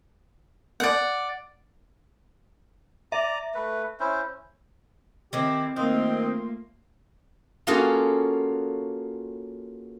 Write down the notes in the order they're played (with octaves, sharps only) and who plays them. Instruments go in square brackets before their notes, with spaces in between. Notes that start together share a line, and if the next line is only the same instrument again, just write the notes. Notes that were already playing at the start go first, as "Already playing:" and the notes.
[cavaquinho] D5 F#5
[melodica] D5 A#5 [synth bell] E5
[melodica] A3 B4
C#4 E4 C5
[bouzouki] D#3 E4 [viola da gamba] C4 [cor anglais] G4
[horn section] D#3 C4 [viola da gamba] A3 A#3 [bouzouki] F4 [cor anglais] D#5
[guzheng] A#3 C#4 F4 F#4 G#4 A4